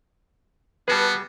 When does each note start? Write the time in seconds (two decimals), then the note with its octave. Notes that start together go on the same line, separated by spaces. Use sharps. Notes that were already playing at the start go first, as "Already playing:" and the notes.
0.88 G3 B3 F#4 G#4 B4 A5